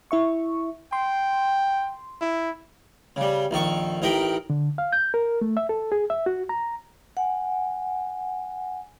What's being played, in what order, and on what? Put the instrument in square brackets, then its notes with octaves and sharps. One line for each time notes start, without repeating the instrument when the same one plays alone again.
[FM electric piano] E4 E5 C#6
[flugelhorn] G5 [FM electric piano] C6
[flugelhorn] E4
[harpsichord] C#3 G3
A#1 D#3 A4 C#6
A1 D#4 A#4 G5 B5
[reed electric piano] D3
F5
G6
A#4
A3
E5
A4
G#4
E5
F#4
A#5
[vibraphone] F#5 G#5